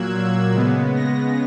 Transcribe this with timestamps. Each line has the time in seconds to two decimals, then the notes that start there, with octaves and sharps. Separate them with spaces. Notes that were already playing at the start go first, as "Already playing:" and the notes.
Already playing: A#2 F#3 A#3 E6 F#6 G#6
0.54 C#3 G#3 B3
0.96 A#6